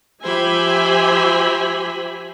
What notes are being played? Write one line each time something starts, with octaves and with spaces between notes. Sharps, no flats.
F3 G4 C5 E5 G#5 B5